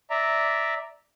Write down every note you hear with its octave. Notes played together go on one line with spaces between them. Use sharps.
D5 E5 A#5